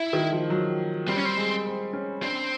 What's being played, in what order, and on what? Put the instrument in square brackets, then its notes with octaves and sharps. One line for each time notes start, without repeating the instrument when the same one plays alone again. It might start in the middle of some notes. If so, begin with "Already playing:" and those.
Already playing: [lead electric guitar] E4
[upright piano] D#3
F3
F#3
[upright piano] G3 [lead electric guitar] C4
[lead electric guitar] C#4
C4
[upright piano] G#3
C4
C#4
[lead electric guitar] C4 [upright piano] D4